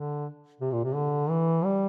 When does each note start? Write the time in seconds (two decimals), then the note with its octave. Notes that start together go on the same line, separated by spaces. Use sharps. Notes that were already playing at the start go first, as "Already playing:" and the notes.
Already playing: D3
0.61 C3
0.72 A#2
0.84 C3
0.96 D3
1.30 E3
1.65 G3